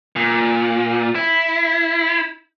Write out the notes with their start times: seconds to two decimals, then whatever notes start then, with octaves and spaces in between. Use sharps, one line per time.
0.16 A#2
1.15 E4